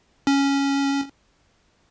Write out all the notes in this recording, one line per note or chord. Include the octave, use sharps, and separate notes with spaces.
C#4